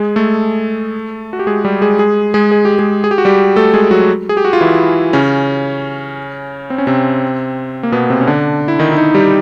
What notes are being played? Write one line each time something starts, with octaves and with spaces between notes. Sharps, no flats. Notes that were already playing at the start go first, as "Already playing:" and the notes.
Already playing: G#3 G#4
A3 A4
F#4
G4
G#3 G#4
G3 G4
G#3 G#4
G#3 G#4
G#3 G#4
G#4
G4
G#3 G#4
G#4
G4
F#4
G3 G4
A3 A4
G#3 G#4
F#3 F#4
G#4
G4
F#4
F4
E3 E4
C#3 C#4
C4
C#4
C3 C4
A#3
B2 B3
C3 C4
C#4
D3 D4
E4
D#3 D#4
E4
D#3 D#4
G3 G4